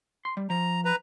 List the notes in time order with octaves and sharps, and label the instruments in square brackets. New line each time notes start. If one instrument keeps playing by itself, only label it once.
[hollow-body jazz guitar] C6
G3
[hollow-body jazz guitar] F3 [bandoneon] A#5
[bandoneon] B4 A#5